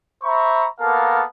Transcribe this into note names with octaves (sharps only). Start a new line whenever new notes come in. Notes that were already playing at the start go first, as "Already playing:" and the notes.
C5 E5 A#5 B5 C#6
A#3 B3 A4 A#4 F5 A5